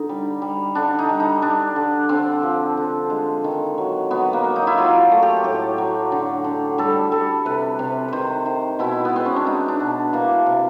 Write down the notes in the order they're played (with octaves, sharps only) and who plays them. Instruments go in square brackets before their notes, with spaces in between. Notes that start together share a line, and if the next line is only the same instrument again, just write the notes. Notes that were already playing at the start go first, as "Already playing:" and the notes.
Already playing: [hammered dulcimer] D3 D#4
G3
G3
D3 D4
D#4
G3
D#4
G3 D4
D3
D3 C4
F3
D3
G#3
D#3
F#3
F#3 B3
A#3
F#3
D#4
E4
F#3 F4
A3
G4
A2 G4
F#3
D3
D3
G3 A4
G3 A4
C3 B4
C3
D#3 B4 C5
D#3
B2 E4
B3
G#3 C4
C#4
D4
G#3 D#4
D4
B2
E3 A#3
C3